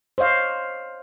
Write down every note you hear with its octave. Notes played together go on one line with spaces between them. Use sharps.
C5 C#5 D#5 F5